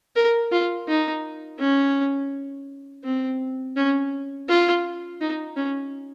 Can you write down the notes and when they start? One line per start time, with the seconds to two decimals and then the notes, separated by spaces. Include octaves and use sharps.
0.16 A#4
0.52 F4
0.88 D#4
1.60 C#4
3.04 C4
3.76 C#4
4.49 F4
5.21 D#4
5.57 C#4